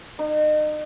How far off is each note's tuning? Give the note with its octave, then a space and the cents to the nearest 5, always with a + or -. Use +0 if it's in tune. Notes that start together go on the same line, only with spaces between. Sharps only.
D#4 -35